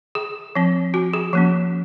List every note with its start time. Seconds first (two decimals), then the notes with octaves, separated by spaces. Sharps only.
0.15 G#4
0.55 F3 C4
0.94 F#4
1.13 G#4
1.33 F3 A#3 C#4